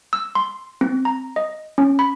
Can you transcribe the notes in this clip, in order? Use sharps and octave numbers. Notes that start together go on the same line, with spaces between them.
E6
C6
C4
A#5
D#5
C#4
B5